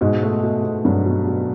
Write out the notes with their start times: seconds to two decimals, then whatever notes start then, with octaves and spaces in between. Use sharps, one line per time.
0.01 G#2 B2
0.23 A3
0.43 B2
0.64 B2
0.85 G2 F#3
1.06 B2
1.27 B2